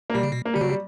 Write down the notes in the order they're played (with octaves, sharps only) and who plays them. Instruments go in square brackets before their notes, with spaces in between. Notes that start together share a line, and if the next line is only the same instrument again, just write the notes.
[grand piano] A#3
[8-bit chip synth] B2 [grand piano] G3
[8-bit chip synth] C#3
B2
[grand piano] A#3
[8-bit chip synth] D3 [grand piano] G3
[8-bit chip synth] C#3 [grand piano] F#3
[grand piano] G3